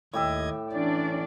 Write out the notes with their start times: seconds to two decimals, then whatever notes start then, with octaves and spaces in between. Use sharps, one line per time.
0.13 D#2 A2 G4 D#5 E5 G#6
0.73 E3 C#4 D4 D5